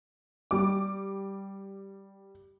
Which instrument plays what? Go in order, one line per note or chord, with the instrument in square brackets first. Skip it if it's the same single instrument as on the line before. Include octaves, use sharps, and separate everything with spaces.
[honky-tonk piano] G3 D6